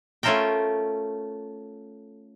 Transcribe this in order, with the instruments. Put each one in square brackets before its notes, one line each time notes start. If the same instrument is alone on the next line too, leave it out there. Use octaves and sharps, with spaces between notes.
[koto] A3 C#4 F4 A4 A#4 G5